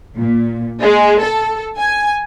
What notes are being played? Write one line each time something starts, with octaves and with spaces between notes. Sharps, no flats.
A#2
G#3
A4
G#5